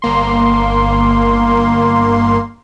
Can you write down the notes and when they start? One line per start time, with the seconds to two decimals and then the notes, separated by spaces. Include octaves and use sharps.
0.02 G1 A#3 C6